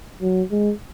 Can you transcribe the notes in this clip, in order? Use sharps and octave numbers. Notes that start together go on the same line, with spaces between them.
F#3
G#3